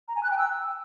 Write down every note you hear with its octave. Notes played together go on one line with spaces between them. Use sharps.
A#5
G#5
F#6
G5
E6